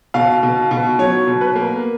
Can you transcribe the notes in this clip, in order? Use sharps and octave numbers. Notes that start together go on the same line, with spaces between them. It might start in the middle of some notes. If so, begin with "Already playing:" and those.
B2 F5
B2
B2
F#3 C#5
B2
B4
A#3